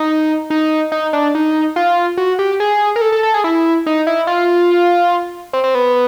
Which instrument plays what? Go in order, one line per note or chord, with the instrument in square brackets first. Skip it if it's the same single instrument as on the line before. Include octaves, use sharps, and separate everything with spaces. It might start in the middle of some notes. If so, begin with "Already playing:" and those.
Already playing: [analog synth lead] D#4
D#4
D#4
D4
D#4
F4
F#4
G4
G#4
A#4
A4
A4
A4
G#4
E4
D#4
E4
F4
C4
C4
B3